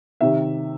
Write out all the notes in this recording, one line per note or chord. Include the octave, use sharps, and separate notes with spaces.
C3 D#3 E5